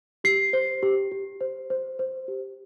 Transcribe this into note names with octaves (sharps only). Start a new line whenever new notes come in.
G4 C7
C5
G4
G4
C5
C5
C5
G4